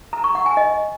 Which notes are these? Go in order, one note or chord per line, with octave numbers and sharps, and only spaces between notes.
A#5
C#6
F#5
G#5
D#5